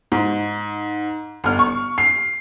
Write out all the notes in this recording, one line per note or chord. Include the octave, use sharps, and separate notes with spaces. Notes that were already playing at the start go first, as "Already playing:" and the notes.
G#2
G1 F6
C#6
C7